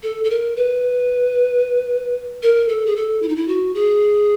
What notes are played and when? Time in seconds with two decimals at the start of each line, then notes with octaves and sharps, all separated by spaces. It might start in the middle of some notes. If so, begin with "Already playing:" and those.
0.03 A4
0.24 A4
0.30 A#4
0.57 B4
2.43 A#4
2.69 A4
2.86 G#4
2.96 A4
3.23 E4
3.28 D#4
3.36 E4
3.48 F#4
3.75 G#4